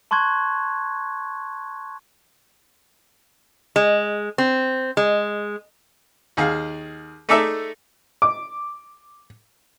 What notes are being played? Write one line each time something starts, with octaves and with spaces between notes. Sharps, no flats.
A5 C6 C#6 F#6 G#6
G#3
C4
G#3
D#2 G#4 F5
A3 D#4 G#4 A4 D5 E5
D6